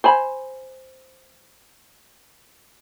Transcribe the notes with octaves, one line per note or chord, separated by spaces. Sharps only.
C5 G#5 B5